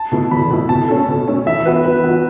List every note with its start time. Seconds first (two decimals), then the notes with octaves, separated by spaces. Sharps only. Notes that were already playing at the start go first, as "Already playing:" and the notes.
Already playing: A5
0.12 B2 A3 E4
0.31 E2 B5
0.50 B2 A3 E4
0.69 B2 A5
0.88 A3 C#4 A4
1.08 B2
1.27 A3 C#4 A4
1.46 E3 E5
1.65 B3 F#4 B4
1.85 E3 B4
2.04 B3 F#4